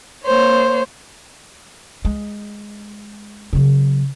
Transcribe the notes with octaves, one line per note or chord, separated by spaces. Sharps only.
A#3 C5 C#5
G#3
C#3 F#3